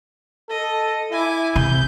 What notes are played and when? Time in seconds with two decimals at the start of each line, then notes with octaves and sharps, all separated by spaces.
0.50 A4 D#5
1.12 E4 G#5 D6
1.56 C3 G6